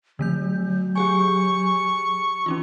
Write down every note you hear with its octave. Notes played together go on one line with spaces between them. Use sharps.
D3 F3 A3 G6
F#3
G4 G#4 G#5 C#6
E3 C#4 D#4 F4